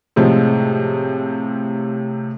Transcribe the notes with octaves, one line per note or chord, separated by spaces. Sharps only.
A2 C3 F3 G#3